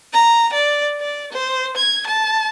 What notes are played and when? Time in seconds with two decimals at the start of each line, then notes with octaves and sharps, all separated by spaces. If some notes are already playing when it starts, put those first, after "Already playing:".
0.13 A#5
0.53 D5
1.00 D5
1.32 C5
1.77 G#6
2.07 A5